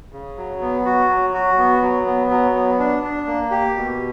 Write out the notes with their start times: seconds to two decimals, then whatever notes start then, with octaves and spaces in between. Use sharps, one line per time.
0.13 C#3
0.37 F#3
0.61 B3
0.85 F#4
1.09 F#3
1.34 F#4
1.58 B3
1.82 F#3
2.06 B3
2.30 F#3
2.55 B3
2.79 D4
3.03 D4
3.27 A#3
3.51 G4
3.76 B2